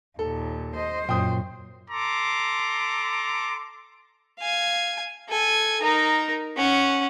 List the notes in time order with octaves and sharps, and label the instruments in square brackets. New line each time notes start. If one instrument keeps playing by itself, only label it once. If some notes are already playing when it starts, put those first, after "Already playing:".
[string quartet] D#2 A#2 [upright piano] A4
[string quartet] C5 [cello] D#5
[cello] F#2 [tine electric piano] A#2 [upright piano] G5 D#6
[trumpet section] A4 A#5 C6 D6
[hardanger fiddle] F5 G#5
A4 G#5
D#4 A#4
C#4 F#5